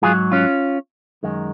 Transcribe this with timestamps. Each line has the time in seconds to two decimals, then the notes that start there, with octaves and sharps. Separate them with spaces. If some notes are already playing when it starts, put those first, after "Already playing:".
0.02 G#2 F#3 F4 G#4
0.32 C#4 F4
1.23 F#2 D#3 G#3